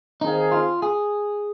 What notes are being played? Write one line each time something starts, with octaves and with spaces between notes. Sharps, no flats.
D#3 C4 D#4 G#4 F5
F4
G#4